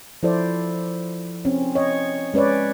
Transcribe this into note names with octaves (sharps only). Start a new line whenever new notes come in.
F3 E4 A4 C5 D5
C4 C#4
C#5 D#5
G#3 C#4 B4 C#5 D5